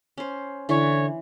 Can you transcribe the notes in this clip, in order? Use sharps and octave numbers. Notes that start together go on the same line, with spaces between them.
C#4 C5
D3 E3 C#5